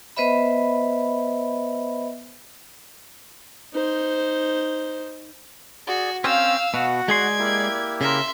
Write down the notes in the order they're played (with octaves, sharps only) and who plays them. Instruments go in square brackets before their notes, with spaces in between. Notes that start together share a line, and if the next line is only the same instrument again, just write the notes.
[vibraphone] B3 B4 C5 D#5 E5 B5
[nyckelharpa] D#4 C5
[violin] F#4 [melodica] G#4 D5
[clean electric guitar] C4 C#4 [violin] F5 E6 [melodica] G5
[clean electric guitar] B2 [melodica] F#4 F#5
[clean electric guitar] G#3 G#4 C6 [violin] D5 G#6
[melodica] A#3 E4 G4
[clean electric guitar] C#3 A#4 [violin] E5 C6